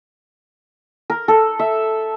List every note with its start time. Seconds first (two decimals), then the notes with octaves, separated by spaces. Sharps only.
1.10 A#4
1.28 A4
1.59 E5